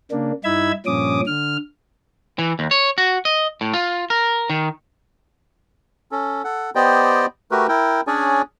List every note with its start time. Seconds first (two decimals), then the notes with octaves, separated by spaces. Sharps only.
0.11 C#3 A#3 D4
0.44 G2 D#4 E4 B5 E6 G#6
0.86 G2 A#2 F3 C#4 D6 D#6
1.27 D3 F6
2.39 E3
2.59 D#2
2.71 C#5
2.98 F#4
3.25 D#5
3.61 A2
3.74 F4
4.10 A#4
4.50 D#3
6.12 C#4 A4
6.44 A4 F#5
6.75 B3 G4 C5 D5 D#5 G5
7.51 A3 F#4 G4 A#4 B4
7.68 E4 A#4 G5
8.07 C#4 D4 G#4 C#5 D5 G#5